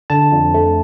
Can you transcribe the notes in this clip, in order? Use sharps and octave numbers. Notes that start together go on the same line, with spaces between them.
D3 A5
F2
A3